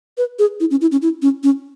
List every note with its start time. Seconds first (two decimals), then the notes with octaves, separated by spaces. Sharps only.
0.18 B4
0.39 G#4
0.60 E4
0.71 C#4
0.81 E4
0.92 C#4
1.02 E4
1.22 C#4
1.43 C#4